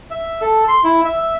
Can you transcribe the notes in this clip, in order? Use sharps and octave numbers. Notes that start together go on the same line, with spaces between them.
E5
A4
C6
E4
E5